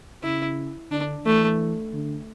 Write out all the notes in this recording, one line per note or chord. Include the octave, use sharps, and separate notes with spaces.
C#3 E4
D3 D4
E3 A3
D3